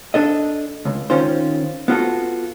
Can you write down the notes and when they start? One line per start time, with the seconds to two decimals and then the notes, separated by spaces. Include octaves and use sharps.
0.14 D4 A4 D#5
0.85 C#2
1.10 D#3 C#4 F4 C5
1.88 B3 F4 F#4 A4